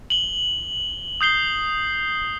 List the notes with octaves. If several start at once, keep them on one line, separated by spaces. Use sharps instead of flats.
F#7 G7
D#6 G6 C7 G7